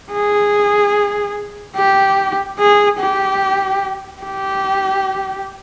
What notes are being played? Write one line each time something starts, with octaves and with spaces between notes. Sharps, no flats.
G#4
G4
G#4
G4
G4